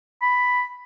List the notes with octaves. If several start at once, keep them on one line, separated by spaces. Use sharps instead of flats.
B5